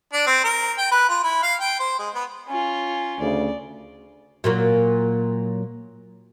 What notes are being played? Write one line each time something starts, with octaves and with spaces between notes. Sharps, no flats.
D4
C4
A#4
G5
B4
F4
E4
F5
G5
C5
G#3
B3
C#4 F4
D2 C#3 D5
A#2 F#3 A#3